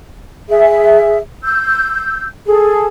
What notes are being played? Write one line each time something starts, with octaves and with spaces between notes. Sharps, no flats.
G#4 E5
E6 G6
G#4 A4